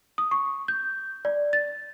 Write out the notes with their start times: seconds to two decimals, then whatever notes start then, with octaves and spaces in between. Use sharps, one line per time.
0.18 D#6
0.31 C#6
0.68 G6
1.25 D5
1.53 A6